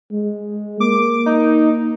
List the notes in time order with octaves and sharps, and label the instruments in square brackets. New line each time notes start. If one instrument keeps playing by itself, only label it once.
[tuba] G#3
[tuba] A#3 [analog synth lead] D6
[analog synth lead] D#4